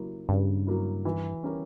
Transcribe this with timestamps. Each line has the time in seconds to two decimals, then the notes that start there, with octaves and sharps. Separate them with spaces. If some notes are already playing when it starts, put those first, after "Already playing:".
Already playing: C#3 F#3 A#3 E4
0.29 G2 C#3
0.67 F#3 A#3 E4
1.05 E3
1.43 G3 C#4 G4 A#4